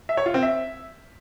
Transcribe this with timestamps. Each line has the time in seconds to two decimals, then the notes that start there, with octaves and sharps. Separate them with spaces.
0.09 E5
0.17 C#5
0.26 F4
0.34 C4
0.43 E5